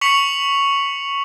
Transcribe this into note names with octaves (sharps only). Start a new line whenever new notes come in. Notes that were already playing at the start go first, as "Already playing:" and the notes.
C#6 B6 C#7 F7 F#7